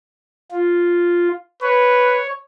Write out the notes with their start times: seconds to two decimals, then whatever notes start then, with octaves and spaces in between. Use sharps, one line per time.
0.52 F4
1.62 B4 C#5